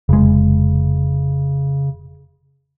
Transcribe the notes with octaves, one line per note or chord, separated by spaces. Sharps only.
F1 C#3 G#3